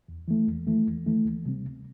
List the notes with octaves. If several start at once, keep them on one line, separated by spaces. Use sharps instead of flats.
E2
E3 A3
E2
E3 A3
E2
E3 A3
D2
C3 G3 C4
D2